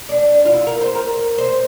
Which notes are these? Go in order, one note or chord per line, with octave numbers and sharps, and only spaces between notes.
D4
F4
E4
A#4
C5
A#4
C5